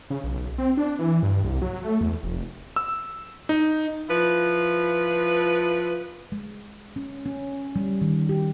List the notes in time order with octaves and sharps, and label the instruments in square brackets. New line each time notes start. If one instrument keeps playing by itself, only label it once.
[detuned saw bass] C#3
B1
C4
D4
E3
G2
C2
F#3
A3
E2
F1
[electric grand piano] E6
D#4
[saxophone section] F3 E4 B4
[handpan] G#3
C#4
C#4
G3
D#3
G4